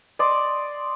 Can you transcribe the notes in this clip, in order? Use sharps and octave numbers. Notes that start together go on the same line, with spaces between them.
D5 D#5 C6 D6